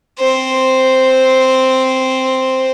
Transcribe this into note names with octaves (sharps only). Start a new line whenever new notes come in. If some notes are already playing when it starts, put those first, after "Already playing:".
C4 C5